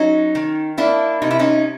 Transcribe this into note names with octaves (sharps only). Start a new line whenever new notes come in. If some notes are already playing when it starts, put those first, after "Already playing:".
Already playing: F#3 C#4 D#4
D#3
A#3 D4 E4
C3 D#4
E4
C#4 D#4